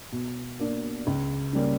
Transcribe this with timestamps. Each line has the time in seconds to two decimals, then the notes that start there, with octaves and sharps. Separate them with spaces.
0.12 B2
0.60 A#3 D4
1.07 C#2
1.53 C#3 G3 A#3 C#4